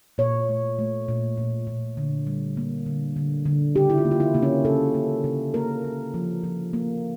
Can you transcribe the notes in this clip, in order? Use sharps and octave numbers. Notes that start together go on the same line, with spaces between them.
A#2 C#5
A3
A3
A#2
A#2
A#2
D3
G3
A#3
D3
D3
D3
C#3 G4
E4
F4
A#3
F4
E4
C#3 A#3
C#4
C#3 A4
A#3
C#3
A#3 A#4
A#3
F3
F3
A#3